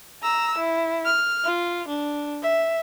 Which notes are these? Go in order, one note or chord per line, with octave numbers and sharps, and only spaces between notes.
A#5 E6
E4
F6
F4
D4
E5